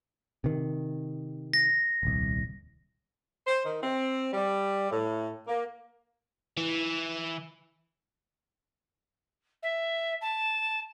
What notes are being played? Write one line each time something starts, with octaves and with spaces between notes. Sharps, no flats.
C3 D#3
A#6
D#1 C2
C5
D#3
C4
G3
A2
A#3
E3
E5
A5